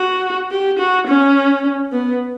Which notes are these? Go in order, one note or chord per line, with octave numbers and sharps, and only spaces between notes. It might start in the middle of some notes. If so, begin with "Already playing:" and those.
Already playing: F#4
G4
F#4
C#4
B3